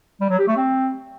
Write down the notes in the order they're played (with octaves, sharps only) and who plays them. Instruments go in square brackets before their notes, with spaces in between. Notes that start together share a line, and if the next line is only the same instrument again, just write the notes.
[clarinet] G3
F#3
G4
A3
C4